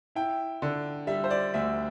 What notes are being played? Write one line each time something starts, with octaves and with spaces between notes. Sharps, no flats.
E4 G5
D3
G3 E5
C5
D5
D2 E5